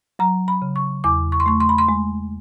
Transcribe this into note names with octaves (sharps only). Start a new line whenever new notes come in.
F#3 A#5
B5
C#3
C#6
E2 D6
C#6
C6
A3 C#6
C6
B5
C6
G#3